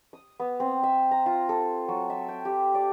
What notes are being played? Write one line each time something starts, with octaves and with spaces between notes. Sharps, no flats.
D#6
B3
C4
E5
A#5
F4
A4
F#3
E5
G5
G4
D5